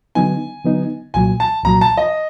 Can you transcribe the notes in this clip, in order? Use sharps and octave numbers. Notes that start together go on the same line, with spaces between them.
D3 F#3 B3 D#4 G#5
D3 F#3 B3 D#4
C2 A#2 F#3 G#5
A5
C2 A#2 F#3 A#5
A5
D#5